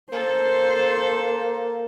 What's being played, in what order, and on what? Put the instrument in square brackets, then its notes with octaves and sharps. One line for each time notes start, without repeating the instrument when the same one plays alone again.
[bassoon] A#3 [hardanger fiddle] A4 [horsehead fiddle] C5